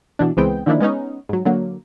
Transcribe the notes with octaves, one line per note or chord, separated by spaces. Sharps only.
B2 E3 D4
C#2 E3 G#3 B3 C4 G5
D3 D#3 F3 A#3 D4 E4
G#3 B3 C#4 D#4
G#2 F#3
D3 F#3 A#3